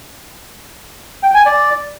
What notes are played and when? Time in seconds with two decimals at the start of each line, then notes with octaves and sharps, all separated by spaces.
1.23 G5
1.34 G#5
1.46 D5